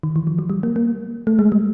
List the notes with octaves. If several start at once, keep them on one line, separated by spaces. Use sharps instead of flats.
D#3
E3
F3
F#3
G3
A#3
A#3
A3
G#3
G3